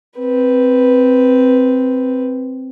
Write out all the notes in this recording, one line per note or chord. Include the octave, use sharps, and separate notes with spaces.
C4 B4